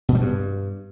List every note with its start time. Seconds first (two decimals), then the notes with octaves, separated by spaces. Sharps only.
0.09 B2
0.15 G3
0.21 G2